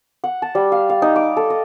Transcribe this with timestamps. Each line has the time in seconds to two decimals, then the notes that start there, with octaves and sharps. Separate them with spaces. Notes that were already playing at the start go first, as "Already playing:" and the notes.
0.24 F#5
0.42 A5
0.55 G3
0.72 F5
0.90 F5
1.02 D#4
1.16 D6
1.37 A4
1.50 D#5